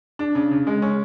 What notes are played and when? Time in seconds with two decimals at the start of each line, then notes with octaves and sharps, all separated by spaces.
0.19 D4
0.35 C#3
0.51 C#3
0.67 G#3
0.82 C#4